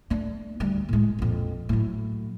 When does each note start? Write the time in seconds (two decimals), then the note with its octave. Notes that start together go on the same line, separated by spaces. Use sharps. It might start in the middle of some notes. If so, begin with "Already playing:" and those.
0.10 A3 D4
0.60 D2 G3
0.89 A2 G#3
1.19 A#1 F2
1.69 A2 F#3